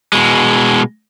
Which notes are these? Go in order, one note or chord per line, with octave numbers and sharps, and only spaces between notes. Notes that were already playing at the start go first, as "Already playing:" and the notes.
B2 G#3